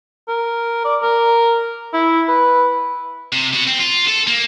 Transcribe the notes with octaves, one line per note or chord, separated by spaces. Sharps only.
A#4
D5
A#4
E4
B4
C3
B3 F#4
C4
F4
A4
A#3